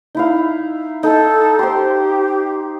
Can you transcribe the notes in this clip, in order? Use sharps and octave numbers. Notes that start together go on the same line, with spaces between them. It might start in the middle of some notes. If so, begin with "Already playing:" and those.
D#4 E4 F5
D#4 A4
G4 C5 C6